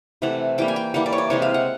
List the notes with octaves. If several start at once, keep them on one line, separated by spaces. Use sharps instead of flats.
C3 E3 A3 F#5
E3 G3 A#3 G5
G#5
G5
E3 G3 A#3 F#5
D5
C#5
D5
C3 E3 G#3 C#5
F5
F#5